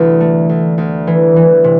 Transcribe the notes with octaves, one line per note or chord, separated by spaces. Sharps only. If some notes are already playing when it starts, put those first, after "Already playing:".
Already playing: D2 C3 E3
A3
D2
D2
E3
E3
C3